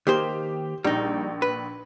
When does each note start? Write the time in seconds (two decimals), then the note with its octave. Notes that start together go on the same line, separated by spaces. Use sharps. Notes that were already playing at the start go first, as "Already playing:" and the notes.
0.07 D#3 A#3 G4 C5
0.84 A#1 G3 D#4
1.42 B4